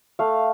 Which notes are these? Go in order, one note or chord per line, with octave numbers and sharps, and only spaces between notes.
A3 F5